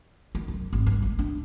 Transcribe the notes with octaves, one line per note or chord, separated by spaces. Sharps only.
D#4
F#2
G#1
G2
A1
D4